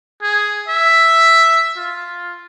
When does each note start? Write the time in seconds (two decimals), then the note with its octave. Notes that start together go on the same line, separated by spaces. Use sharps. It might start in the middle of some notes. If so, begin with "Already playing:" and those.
0.23 G#4
0.68 E5
1.76 F4